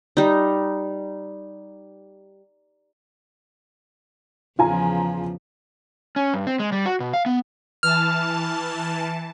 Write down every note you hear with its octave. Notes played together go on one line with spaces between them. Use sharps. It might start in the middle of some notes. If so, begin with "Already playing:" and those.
G3 D#4
E2 C#3 F3 F4 G#5 A#5
C#4
G2
C4
G#3
G3
F#4
B2
F5
B3
E3 A5 F6